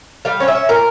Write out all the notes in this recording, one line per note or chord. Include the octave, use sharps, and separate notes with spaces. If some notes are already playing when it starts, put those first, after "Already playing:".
G3 F5
C#4 C#5
E5
C#4
A#2 A#4